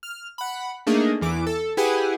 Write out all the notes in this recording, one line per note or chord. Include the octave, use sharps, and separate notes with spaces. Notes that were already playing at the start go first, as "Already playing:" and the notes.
F6
F#5 B5
A3 A#3 D4 D#4 G#4 A#4
E2 E3 D6
A4
E4 G4 G#4 B4 F#5 G#5